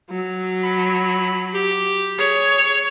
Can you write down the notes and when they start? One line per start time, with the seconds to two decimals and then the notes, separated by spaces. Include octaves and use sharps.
0.10 F#3
0.63 B5
1.54 G4
2.19 G#4 C#5